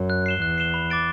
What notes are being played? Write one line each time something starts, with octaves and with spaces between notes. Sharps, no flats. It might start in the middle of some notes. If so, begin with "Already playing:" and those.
Already playing: F#2
F#6
C7 E7 G7
E2 F#6
C7 E7 G7
B5
D6 A6 D7